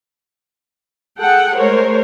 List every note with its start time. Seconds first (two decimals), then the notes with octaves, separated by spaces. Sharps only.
1.19 G#4 A4 F#5 G5
1.57 G#3 A3 A#4 C5 C#5